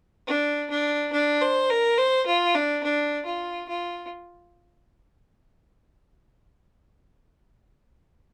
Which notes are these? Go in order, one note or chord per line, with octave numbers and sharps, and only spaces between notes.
D4
D4
D4
C5
A#4
C5
F4
D4
D4
F4
F4